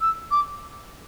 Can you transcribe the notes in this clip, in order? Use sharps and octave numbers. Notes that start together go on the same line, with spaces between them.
E6
D6